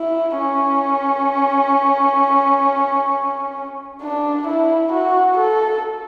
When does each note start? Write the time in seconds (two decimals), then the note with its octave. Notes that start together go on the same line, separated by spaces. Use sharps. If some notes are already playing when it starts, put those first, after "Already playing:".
Already playing: E4
0.39 C#4
4.02 D4
4.47 E4
4.92 F#4
5.38 A4